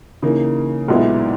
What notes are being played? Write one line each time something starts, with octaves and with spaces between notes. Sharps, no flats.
C#3 E3 A#3 D#4
B1 A#2 G#3 B3 E4